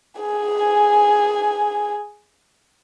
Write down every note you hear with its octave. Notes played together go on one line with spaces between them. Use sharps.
G#4 G#5